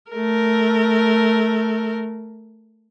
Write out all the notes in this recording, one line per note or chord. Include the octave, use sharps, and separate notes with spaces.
A3 A#4